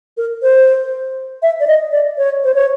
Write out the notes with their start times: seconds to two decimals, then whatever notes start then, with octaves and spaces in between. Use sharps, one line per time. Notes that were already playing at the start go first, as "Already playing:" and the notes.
0.17 A#4
0.43 C5
1.42 E5
1.60 D5
1.67 D#5
1.92 D5
2.18 C#5
2.44 C5
2.54 C#5